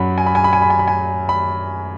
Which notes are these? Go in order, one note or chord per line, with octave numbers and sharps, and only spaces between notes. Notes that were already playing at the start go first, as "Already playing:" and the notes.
Already playing: F#2 F#3 F#5 B5
G#5
B5
G#5
B5
G#5
B5
G#5
B5
G#5
B5